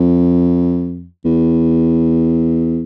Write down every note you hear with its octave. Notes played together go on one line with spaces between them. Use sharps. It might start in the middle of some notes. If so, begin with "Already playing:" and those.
Already playing: F2
E2